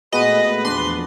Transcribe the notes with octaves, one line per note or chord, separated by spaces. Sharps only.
A#2 G#3 A3 B3 F#4 B4 D#5
E2 F3 D4 C6 A6